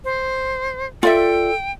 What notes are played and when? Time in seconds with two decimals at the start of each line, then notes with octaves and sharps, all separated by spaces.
0.04 C5
1.03 F4 A4 D5 E5 G5